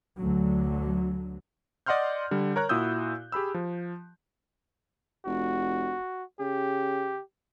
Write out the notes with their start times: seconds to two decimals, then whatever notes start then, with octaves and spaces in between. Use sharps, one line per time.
0.18 D2 D3 F#3
1.86 D5 D#5 F#5 C6 F6 G6
2.31 D3 G3
2.56 A#4 C#5 A#5 F#6
2.69 A#2 E4 F#4 D#6 E6 G6
3.32 G4 G#4 B5 E6
3.54 F3
5.26 F1 F#4
6.40 C#3 G4